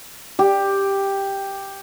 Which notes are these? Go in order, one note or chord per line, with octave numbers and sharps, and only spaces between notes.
G4